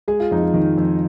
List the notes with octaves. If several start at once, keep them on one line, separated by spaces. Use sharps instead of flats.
G#3 G#4
F4
F2 D#4
F4
D#3
F2